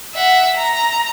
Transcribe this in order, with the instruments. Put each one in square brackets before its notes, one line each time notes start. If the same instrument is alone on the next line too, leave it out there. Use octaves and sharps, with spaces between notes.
[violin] E5 F#5
A#5